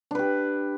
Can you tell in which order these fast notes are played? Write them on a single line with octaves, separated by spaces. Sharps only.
D4 B4 G4